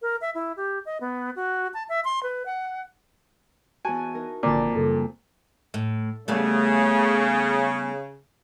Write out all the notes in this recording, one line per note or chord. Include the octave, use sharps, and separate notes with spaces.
A#4
E5
E4
G4
D#5
B3
F#4
A5
E5
C6
B4
F#5
E2 F#4 G#5 A5
D#4 A#4
G#1 F2 A#2 D3 A#3 D5 A5 D6
F#2 C#3 G3 A4
A2
C#3 G3 A3 B3